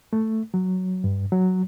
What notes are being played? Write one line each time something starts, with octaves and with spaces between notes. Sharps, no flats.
A3
F#3
G2
F#3